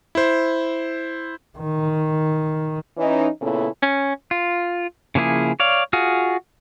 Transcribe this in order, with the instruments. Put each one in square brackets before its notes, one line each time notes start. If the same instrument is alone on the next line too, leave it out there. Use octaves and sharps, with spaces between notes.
[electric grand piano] E4 C5
[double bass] D#3
[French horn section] E3 C#4 D#4
A#2 C#3 B3 C#4 E4 A4
[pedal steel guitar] C#4
F4
C#3 F3 A#3 E4 G#4
C#5 D5 F5
F4 F#4 G#4